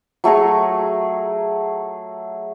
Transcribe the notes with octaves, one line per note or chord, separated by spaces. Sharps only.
F#3 A3 G#4 A#5